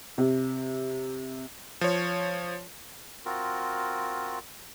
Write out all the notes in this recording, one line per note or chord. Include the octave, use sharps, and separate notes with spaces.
C3
F3 C#5
C4 F4 F#4 A#4